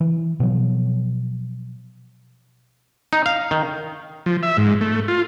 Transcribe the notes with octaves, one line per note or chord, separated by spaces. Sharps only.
E3
B2 F3 F#3
D#4
F5
D#3
F3
E5
G#2
A3
F4